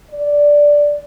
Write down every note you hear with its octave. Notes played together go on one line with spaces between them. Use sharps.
D5